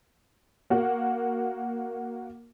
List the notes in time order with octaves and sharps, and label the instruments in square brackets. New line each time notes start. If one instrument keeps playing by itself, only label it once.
[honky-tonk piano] A#3 F#4